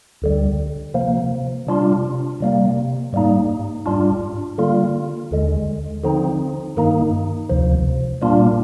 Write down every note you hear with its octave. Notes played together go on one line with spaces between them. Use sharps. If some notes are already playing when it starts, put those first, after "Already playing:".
D2 D3 G3
C3 F3 A#3
C3 G3 D4 F4
C3 G3 A#3
G#2 G3 A#3 D#4
G#2 G3 D4 F4
D3 G3 A#3 F4
D#2 D3 G#3
D3 F3 C4 D#4
G2 D#3 A#3 D#4
D2 C3 F3
A#2 G3 A#3 D4 F4